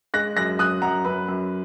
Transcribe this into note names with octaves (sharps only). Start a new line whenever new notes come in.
G#3 F#6 A#6
F#2 F#6 A#6
F#2 D#6 F#6
F#2 F#5 A#5
F#2 B4
F#2